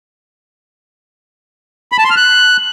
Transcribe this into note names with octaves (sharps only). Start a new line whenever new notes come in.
B5
A5
C6
F6
F#6